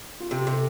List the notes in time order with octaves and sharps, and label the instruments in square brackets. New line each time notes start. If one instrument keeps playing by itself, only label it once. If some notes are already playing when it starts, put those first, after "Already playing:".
[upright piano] F4
[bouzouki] C3 [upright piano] G4
[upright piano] G4
[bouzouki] C3
[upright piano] A4